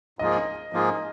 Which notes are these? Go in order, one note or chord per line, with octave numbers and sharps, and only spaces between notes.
G#2 F3 A#3 F4 G#4 D#5
G#2 F3 A#3 F4 G#4